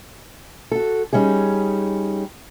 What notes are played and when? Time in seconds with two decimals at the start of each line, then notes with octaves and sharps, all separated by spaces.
0.72 F#4 A4
1.13 G3 C#4 D#4 G#4